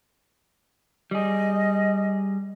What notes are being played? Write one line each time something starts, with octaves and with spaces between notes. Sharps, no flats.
G3 G#4 D#5